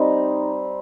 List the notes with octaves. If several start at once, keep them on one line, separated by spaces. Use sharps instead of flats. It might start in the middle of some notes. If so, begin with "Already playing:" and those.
Already playing: G3 C4 D#4